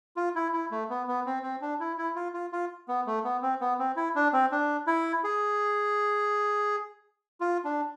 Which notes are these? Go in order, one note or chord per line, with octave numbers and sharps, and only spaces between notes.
F4
E4
E4
A3
B3
B3
C4
C4
D4
E4
E4
F4
F4
F4
B3
A3
B3
C4
B3
C4
E4
D4
C4
D4
E4
G#4
F4
D4